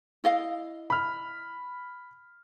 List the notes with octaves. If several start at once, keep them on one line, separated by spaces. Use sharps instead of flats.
E4 D#5 F5
B5 F6